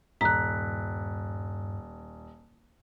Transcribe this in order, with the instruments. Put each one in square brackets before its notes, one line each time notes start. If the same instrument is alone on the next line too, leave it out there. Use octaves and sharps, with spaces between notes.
[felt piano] D#1 [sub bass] G2 [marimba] A#5 [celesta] F#6 B6